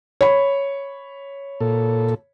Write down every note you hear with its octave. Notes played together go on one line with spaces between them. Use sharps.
C#5 B5
A#2 A4